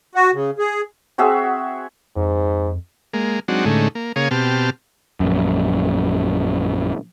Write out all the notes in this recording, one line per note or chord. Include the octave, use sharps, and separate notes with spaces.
F#4
C#3
G#4
C4 F#4 G#4 E5
F2 G#2
G#3 A#3
F#3 G#3 C4 D4 D#4 F#4
A2 D3 G#3 A3 C#4 D#4
A#3
C#3 A#3 G#4 C#5 F5 D#6
B2 C4 G4 A5 F6
A#1 F#2